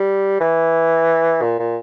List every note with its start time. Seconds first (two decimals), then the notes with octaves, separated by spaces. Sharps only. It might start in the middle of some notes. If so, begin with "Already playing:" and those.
Already playing: G3
0.40 E3
1.42 A#2
1.59 A#2